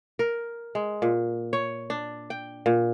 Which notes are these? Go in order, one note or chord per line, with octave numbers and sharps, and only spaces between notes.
A#4
G#3
A#2
C#5
D4
G5
A#2